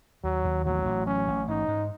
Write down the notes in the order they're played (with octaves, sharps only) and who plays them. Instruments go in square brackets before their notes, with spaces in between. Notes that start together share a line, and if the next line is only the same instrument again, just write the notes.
[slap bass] D#2 [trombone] F#3
[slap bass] D#2
[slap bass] A1 [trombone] F#3
[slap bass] A1
[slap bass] F#3 [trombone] C#4
[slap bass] A1
[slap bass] G#2 [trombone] D#4
[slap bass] G#2